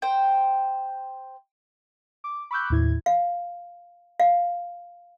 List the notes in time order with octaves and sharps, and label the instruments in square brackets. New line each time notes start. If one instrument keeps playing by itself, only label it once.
[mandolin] C5 G5
[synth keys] D6
B5 C#6 D6 E6 F#6 G6
D#2 A2 E4 G#6
[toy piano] F5
F5